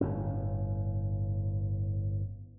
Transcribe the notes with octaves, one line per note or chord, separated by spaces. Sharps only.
G1 A2 C#4